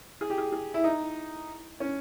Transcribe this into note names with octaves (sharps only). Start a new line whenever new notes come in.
G#4
G4
G#4
G#4
E4
D#4
C#4